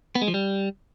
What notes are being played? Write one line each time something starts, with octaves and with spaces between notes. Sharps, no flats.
B3
G#3
F3
G3